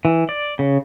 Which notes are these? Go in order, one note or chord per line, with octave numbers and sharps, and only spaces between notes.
E3
D5
C#3